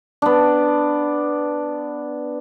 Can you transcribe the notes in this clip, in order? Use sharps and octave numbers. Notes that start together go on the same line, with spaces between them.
B3 D4